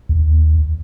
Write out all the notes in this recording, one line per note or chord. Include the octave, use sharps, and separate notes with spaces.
D#2